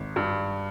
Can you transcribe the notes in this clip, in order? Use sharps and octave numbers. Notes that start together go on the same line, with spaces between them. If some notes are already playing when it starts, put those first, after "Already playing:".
Already playing: G#1
G2